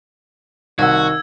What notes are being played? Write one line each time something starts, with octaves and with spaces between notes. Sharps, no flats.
C2 D#3 F#4 F#5 E6 G#6